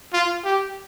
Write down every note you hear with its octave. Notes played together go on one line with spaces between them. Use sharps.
F4
G4